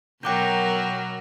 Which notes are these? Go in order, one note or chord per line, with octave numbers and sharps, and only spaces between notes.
B2 F#3 A#4 G5 D6 G6